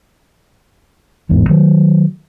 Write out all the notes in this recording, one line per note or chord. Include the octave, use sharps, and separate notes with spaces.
A1 E2 G#2
D#3 F#3 A3